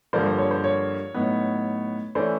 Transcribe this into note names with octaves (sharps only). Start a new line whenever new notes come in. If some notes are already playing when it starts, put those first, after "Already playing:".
G2 D3 F3 A#3 C5 D5
C5
C#5
C5
C#5
A2 F#3 B3 D#4
E3 A3 C#4 E4 C5 D5